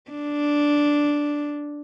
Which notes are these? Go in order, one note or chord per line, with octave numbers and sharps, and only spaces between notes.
D4